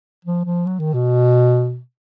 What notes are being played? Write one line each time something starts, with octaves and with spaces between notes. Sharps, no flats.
F3
F3
F#3
D#3
B2